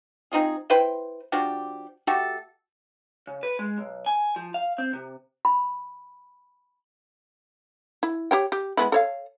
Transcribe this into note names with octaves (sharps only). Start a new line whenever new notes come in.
C4 D#4 F4 G#4
E4 B4 C5 G5
F3 D4 F#4 G4
A3 F#4 G4 A4
C#3
B4
G#3
B1
G#5
F3
F5
C4
C3
B5
E4
G4 C#5 G5
G4
G#3 B3 E4
A4 C#5 F5